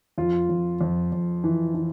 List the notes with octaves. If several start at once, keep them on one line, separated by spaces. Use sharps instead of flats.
F2 F4
F2
F2
F2
E3
E3